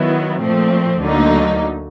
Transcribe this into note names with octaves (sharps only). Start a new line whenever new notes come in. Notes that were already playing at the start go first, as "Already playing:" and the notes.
Already playing: D#3 F#3 B3 E4
A#2 F3 A3 C4
D2 D3 F#3 A#3 D#4